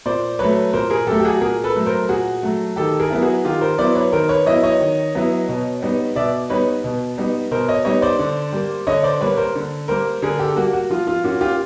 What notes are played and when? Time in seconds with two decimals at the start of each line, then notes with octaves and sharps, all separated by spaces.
0.06 A#2 C5 D5
0.39 F#3 A3 B4 C#5
0.73 A#2 A#4 C5
0.90 G#4 A#4
1.07 F#3 A3 G4 A4
1.20 G4
1.25 F#4 G#4
1.41 A#2 G#4 A#4
1.64 A4 B4
1.76 F#3 A3
1.86 A#4 C5
2.09 A#2 F#4 G#4
2.43 F#3 A3
2.76 D#3 G4 A4
2.99 G#4 A#4
3.10 F#3 B3 E4
3.22 F#4 G#4
3.45 D#3 F4 G4
3.61 A#4 C5
3.78 F#3 B3 E4 C5 D5
3.95 B4 C#5
4.12 D#3 A#4 C5
4.29 B4 C#5
4.46 F#3 B3 E4 C#5 D#5
4.63 C#5 D#5
4.81 D#3
5.15 F#3 B3 E4
5.49 B2
5.82 G3 B3 D#4
6.16 B2 D5 E5
6.50 G3 B3 D#4 B4 C#5
6.84 B2
7.18 G3 B3 D#4
7.51 B2 A#4 C5
7.68 C#5 D#5
7.85 G3 B3 D#4 C#5 D#5
8.02 C5 D5
8.19 D3
8.53 G3 A#3
8.87 D3 C#5 D#5
9.04 C5 D5
9.21 G3 A#3 B4 C#5
9.37 A#4 C5
9.55 D3
9.88 G3 A#3 A#4 C5
10.22 D3 G#4 A#4
10.39 G4 A4
10.56 G3 A#3 F#4
10.73 F#4
10.90 F3 F4
11.07 F4
11.24 A#3 C#4 F4 F#4
11.41 F4 G4